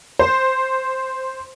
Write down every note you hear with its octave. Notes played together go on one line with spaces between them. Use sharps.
C5